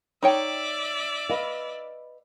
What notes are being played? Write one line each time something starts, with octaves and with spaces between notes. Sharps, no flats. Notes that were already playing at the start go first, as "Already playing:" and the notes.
D#4 C#5 D5 E5 G5
B4 D#5 F5